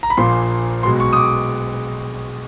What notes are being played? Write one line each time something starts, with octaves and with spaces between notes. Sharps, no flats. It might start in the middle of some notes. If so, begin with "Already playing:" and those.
A#5
B5
A#1 A#2 F3 A#3 C6
B1 B2 G#3 B3 C6
C#6
D#6
D6